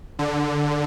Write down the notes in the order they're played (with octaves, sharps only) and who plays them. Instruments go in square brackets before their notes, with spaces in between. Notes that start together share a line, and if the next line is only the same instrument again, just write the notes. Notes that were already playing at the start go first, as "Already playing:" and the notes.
[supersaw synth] D3